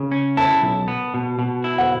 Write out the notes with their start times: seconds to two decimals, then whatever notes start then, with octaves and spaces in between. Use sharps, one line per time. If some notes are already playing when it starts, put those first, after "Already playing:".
Already playing: C#3
0.12 C#4
0.37 E4 A5
0.62 B1
0.88 B3
1.14 B2
1.39 B2
1.64 E4
1.78 F#5